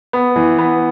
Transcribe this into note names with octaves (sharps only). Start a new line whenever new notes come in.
B3
E3
B3